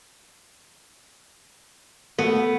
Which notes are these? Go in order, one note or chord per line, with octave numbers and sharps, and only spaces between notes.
A3 B3